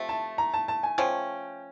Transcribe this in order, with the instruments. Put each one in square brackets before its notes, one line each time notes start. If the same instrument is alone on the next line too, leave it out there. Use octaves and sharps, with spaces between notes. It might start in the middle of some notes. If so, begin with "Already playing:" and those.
Already playing: [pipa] C3 F3 A3
[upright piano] A5
A#5
A5
A5
G#5
[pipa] F3 A3 C#4 [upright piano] G5